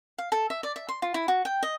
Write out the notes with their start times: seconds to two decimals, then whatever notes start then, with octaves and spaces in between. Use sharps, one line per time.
0.18 F5
0.32 A4
0.50 E5
0.63 D5
0.76 E5
0.89 C6
1.02 F4
1.14 E4
1.28 F#4
1.45 G5
1.63 D#5